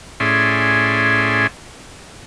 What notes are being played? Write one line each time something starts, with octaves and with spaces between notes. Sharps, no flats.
A2 C#4 G#4 D5 E5 C6